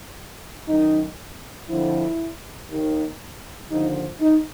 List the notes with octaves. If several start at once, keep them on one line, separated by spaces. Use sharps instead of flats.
F#2 D#3 D#4
F2 D3 F3 E4
D#2 D#3
D#2 D3 F3 D#4
D#4